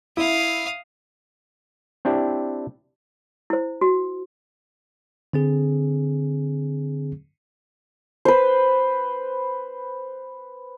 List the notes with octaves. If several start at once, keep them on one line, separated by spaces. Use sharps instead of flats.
E4 F5 D#6
C4 D4 E4 G4
E4 C5
F#4
D3 C4 G#4
B4 C5